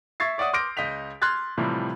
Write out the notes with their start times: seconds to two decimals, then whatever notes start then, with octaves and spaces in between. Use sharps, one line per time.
0.20 E5 C#6 G#6 A6 C7
0.38 C#5 D5 E5 F#5 D#6
0.53 C6 D6 F6 G6 A#6 D7
0.77 C#2 D#5 G6 B6 F7
1.22 C6 F6 F#6 G#6 A6
1.58 A2 C3 E3 F3 G3